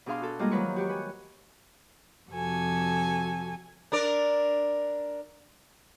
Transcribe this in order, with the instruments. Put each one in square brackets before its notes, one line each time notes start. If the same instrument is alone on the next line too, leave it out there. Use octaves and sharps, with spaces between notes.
[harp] B2 D4 G#4 F5 C6
F#4 A4
G3 G#3 A#3 F4 G#4 D#5
D#3 F3 F#3 B4 C#6
F#4 G4 C#6
B4 G#5
[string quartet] F2 C3 F#4 A4 G#5
[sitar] D4 A#4 D5